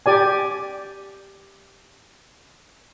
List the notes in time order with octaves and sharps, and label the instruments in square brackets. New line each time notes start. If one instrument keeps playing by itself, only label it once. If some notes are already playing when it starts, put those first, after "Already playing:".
[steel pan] G4 D5 G#5